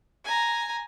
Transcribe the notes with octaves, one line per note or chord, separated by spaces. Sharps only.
G#5 A#5